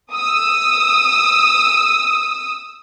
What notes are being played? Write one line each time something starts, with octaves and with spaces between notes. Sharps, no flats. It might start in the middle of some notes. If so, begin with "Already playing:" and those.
D#6 E6